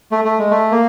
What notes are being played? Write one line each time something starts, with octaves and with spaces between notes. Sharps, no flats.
A3
A3
G#3
A3
A#3